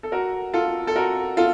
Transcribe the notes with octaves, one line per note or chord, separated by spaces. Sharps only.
A4
F#4 A#4
F4 A4
A4
F#4 A#4
F4 A4